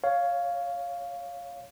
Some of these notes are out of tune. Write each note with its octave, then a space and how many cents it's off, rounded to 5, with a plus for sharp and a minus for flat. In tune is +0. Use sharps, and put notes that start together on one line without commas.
C#5 +15 F5 +0